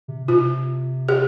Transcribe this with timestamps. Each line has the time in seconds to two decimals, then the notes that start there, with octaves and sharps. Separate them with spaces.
0.08 C3
0.28 C3 F4
1.09 G4